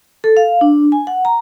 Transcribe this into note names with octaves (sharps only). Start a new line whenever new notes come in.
A4
F5
D4
G#5
F#5
A#5